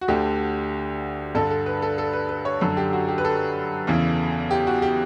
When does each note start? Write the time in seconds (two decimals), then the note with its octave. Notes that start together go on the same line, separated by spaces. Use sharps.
0.01 F#4
0.08 D2 D3 G4
1.35 G2 D3 A4
1.50 A4
1.66 B4
1.82 A4
1.98 A4
2.13 B4
2.29 B4
2.45 C#5
2.61 F#2 D3 A4
2.77 G4
2.93 F#4
3.09 G4
3.18 B4
3.25 A4
3.87 E2 C#3 E3
4.51 G4
4.67 F#4
4.82 G4